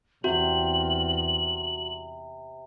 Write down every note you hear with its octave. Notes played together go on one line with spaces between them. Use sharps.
E2 C3 F#4 F#7